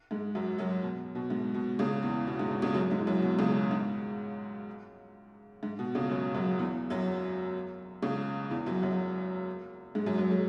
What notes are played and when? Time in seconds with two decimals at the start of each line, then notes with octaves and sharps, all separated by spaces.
0.11 G#2 G#3
0.35 F#2 F#3
0.59 F#2 F#3
0.83 B2
1.15 B2
1.30 G#2
1.54 B2
1.79 C#2 C#3
2.02 E2 E3
2.27 B2
2.39 G#2
2.51 B2
2.62 C#2 C#3
2.74 F#2 F#3
2.91 G#2 G#3
2.99 E3
3.07 F#2 F#3
3.23 B2
3.38 C#2 C#3
3.55 B2
3.71 G#2
5.63 G#2
5.79 B2
5.95 C#2 C#3
6.10 F#2 F#3
6.35 F#2 F#3
6.59 E2 E3
6.90 F#2 F#3
8.02 C#2 C#3
8.50 E2 E3
8.66 F#2 F#3
8.82 F#2 F#3
9.95 G#2 G#3
10.06 F#2 F#3
10.18 F#2 F#3
10.31 G#3